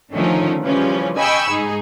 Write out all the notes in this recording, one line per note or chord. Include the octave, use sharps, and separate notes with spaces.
D3 D#3 F3 A3 C#4 D#4
C#3 E3 F3 G3 C#4
D#5 G5 G#5 B5 C#6 E6
G#2 D#4 G#4